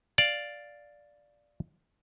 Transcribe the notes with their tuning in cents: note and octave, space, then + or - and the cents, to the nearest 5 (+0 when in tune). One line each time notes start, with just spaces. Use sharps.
D5 +0 F5 +0